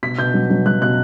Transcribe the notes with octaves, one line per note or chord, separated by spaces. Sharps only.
B2 B6
B2 G6
F#3
F#3
F#3 F#6
B2 F#6